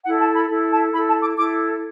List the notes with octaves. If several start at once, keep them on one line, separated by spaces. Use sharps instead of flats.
E4 A4 F#5
A5
B5
E4 A4
A5
E4 A4 B5
A5
D6
E4 A4 D6